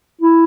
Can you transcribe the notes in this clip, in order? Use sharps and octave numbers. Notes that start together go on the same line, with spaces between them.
E4